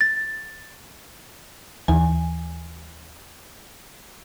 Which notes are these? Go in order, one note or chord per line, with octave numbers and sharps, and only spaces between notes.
A6
D#2 E3 G#5